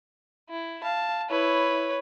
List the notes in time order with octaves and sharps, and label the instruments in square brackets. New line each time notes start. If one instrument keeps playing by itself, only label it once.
[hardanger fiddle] E4
[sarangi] F5 [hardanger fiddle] A5
[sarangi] E4 [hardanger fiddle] B4 C#5